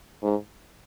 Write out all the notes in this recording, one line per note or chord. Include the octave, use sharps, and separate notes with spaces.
G#2